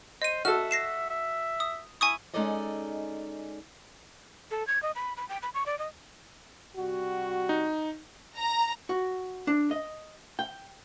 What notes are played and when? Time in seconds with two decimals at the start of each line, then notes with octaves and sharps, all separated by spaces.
0.22 C5 D#5 D#7
0.45 F#4 A4 E5 F6
0.71 A#6 C7 E7
1.10 E5
1.60 D#6
2.01 E4 G#5 C#6 D#6
2.34 G#3 C#4 D#4 A4 D5 D#5
4.51 A4
4.67 G#6
4.83 D#5
4.95 B5
5.17 B5
5.29 G5
5.42 B5
5.54 C#6
5.66 D5
5.79 D#5
6.77 C3 G3 F#4
7.49 D#4
8.37 A#5
8.89 F#4
9.47 D4
9.71 D#5
10.39 G5